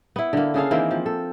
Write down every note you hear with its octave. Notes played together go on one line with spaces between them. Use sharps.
B3 E4
D3 A#3
C#3 G#4 A4 F5
D#3 E3 A#3 C4
F3
A4